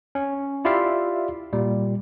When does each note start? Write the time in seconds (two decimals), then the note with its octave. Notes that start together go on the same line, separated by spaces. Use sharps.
0.15 C#4
0.65 E4 F4 G4 D5 E5 F5
1.53 A#2 G3